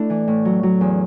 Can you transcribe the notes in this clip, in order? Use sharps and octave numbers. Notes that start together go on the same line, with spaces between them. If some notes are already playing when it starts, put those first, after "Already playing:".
Already playing: A3 D4 E4
E3
A2
F#3
F#3
E2